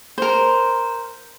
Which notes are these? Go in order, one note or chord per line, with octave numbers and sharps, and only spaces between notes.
A#4 C5